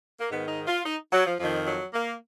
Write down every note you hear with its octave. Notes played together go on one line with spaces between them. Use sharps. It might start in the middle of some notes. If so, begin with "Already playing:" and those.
A#3
G#2 D#3 B3
D#4
F4
D#4
F#3
F3
F2 D#3 F3
F#3
A#3